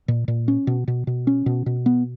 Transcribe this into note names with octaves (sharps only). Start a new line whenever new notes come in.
A#2
A#2
C#4
B2
B2
B2
C#4
B2
B2
B3